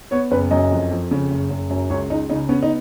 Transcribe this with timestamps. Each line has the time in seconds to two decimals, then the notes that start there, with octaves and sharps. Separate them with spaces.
0.11 B3 C#5
0.31 F#1 B4
0.51 F#2 D#5
0.71 F2
0.91 F2
1.11 C#3
1.31 F#1
1.50 F#1
1.70 F#2
1.90 C#2 C#5
2.10 C#2 D#4
2.29 C#3 D#4
2.49 B3 C#4
2.63 D#4